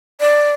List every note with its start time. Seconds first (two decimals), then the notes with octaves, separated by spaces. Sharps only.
0.20 D5